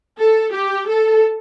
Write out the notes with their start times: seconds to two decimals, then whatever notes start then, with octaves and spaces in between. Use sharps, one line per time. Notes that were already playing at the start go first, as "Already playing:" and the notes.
0.19 A4
0.53 G4
0.88 A4